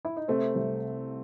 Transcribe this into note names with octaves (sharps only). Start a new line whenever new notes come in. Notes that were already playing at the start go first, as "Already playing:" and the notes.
E4
D#4
C3 A3 C4
C2